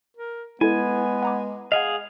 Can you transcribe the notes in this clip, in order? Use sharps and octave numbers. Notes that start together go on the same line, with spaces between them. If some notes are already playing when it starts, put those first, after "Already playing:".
A#4
G#3 B3 E4 A4 G#5
F#5 A#5 D6
G#4 D#5 F5 F#5